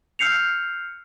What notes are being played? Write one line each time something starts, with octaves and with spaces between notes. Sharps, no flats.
E6 F6 G6 C7 C#7 F7